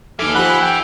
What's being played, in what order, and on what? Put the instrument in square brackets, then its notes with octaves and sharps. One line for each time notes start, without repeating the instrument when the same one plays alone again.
[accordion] D#2 D6 F6 [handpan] D#4 A4 [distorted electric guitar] E5 G#5
[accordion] F3 B5 F#6 [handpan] G4 F#5
[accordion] G5